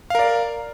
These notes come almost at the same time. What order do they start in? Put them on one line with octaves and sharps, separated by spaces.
F5 A#4 D5